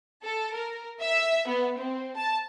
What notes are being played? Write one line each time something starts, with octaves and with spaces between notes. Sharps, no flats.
A4
A#4
E5
B3
C4
A5